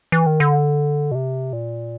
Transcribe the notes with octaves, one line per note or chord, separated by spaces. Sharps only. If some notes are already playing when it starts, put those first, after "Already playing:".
E3
D#3
D3
B2
C3
A#2